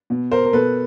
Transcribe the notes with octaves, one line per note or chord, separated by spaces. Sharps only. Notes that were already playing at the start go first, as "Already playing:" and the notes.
B2
A#4 C5
A#4
B2 A4 B4